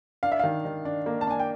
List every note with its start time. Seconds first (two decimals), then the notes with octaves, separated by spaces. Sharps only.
0.23 D4 F5
0.32 E5
0.39 D#3 F5
0.65 D#3
0.85 D4
1.06 A#3
1.21 A5
1.27 D4 G#5
1.39 G5